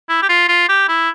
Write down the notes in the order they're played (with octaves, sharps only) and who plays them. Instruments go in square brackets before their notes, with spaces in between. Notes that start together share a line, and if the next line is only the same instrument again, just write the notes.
[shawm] E4
G4
F4
F4
G4
E4